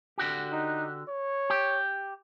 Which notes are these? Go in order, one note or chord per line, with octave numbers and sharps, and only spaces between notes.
D3 F#4 G4
D#4
C#5
G4